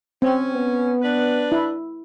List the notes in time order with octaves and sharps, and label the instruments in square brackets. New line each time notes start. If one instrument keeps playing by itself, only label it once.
[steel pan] C4 [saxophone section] C#4
[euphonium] B3
[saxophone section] D4 B4
[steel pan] E4